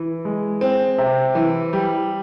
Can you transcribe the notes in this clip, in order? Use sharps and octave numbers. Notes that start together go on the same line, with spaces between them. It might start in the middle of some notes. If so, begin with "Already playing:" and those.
Already playing: E3
G#3
C4
C3
E3
G3